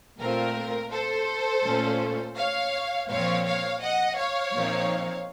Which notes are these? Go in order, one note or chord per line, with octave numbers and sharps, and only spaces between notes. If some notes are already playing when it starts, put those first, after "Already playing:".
A#2 A3 C4 F4 A#4
A4 C5
A#2 A3 C#4 F4
C#5 F5
A#2 F3 C4 C#5 F5
C#5 F5
D#5 F#5
C#5 F5
A#2 F3 C4 D#4